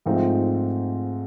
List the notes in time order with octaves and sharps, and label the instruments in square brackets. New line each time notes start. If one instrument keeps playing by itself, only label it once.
[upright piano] G#2 F3 A3 C4 D#4